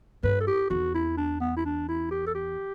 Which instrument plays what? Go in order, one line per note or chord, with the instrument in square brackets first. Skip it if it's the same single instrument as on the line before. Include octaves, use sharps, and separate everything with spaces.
[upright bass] G2 [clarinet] B4
[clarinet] A4
G4
[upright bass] E2 [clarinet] F#4
[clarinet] E4
D4
B3
E4
D4
E4
G4
A4
G4